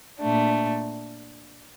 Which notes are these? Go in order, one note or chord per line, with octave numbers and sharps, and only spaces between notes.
A#2 A3 D4